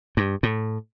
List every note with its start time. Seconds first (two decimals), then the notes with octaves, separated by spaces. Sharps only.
0.17 G2
0.43 A2